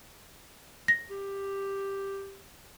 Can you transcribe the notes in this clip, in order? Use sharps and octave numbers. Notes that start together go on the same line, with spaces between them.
A#6
G4